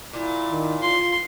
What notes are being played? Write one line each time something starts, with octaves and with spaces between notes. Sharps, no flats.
A#2 E4
D#3
F4 C6